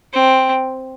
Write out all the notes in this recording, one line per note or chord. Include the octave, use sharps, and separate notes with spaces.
C4